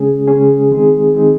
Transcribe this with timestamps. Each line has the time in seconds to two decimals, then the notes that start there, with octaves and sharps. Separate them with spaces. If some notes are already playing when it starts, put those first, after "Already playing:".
Already playing: C#3 G#3 C#4 G#4
0.27 C#3 G#3 C#4 G#4
0.71 D#3 G#3 C4 D#4 G#4
1.15 D#3 G#3 C4 D#4 G#4